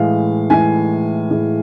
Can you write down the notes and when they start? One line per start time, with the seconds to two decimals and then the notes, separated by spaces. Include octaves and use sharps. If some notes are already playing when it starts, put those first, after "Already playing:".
Already playing: A2 E3 G#3 F5
0.50 A2 E3 G#3 G#5
1.30 A2 E3 G#3